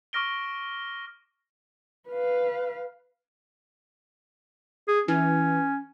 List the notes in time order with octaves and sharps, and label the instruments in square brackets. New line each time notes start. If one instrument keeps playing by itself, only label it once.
[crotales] C#6 D6 F6 A#6 D7 G7
[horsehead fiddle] B4 F5
[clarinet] G#4
[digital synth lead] E3 [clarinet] C#4